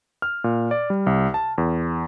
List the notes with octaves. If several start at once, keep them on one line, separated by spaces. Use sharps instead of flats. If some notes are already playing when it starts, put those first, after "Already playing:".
F6
A#2
D5
G3
C2
A5
E2